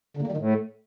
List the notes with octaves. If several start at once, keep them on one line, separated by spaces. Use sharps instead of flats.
D3
A#3
G3
D#3
A2